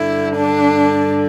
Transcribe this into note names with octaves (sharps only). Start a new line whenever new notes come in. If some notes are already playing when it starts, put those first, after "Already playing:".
Already playing: G2 D3 E4
D4